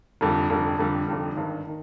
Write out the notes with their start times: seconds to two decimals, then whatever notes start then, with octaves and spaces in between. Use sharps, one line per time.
0.21 F1 F2 D3 G3
0.50 F1 F2 D3 G3
0.79 F1 F2 D3 G3
1.07 F1 F2 D3 G3
1.36 G#1 G2 D#3
1.67 D#3